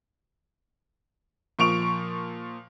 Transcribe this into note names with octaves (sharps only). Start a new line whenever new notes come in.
A#2 F3 C#6 D7 F7